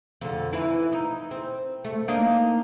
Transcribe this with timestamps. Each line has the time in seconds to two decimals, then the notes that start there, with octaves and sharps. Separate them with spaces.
0.21 F2 D3
0.53 E3 E4
0.92 D#4
1.31 C4
1.85 A3
2.08 A#3 D4 D#4